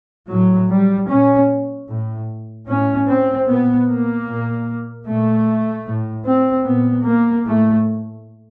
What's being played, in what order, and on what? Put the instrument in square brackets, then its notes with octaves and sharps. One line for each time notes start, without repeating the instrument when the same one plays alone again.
[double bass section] A2 F#3
G3
A#2 C#4
A2
A2 C#4
C4
A#2 B3
A#3
A#2
A#2 A3
A2
C4
A#2 B3
A#3
A2 A3